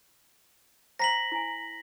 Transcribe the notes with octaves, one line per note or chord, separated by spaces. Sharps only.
C5 G5 A#5 A#6 B6 F#7
E4 G#5